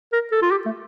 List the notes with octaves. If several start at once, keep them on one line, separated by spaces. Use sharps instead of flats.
A#4
A4
F4
G4
A3